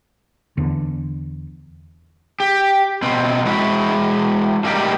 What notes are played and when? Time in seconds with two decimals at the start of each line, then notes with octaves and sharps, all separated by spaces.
0.57 E2 D3
2.40 G4
3.02 B2 C4
3.45 G#3 E4 F#4 E5
4.64 A2 G3 A#3 C4 D#4 G4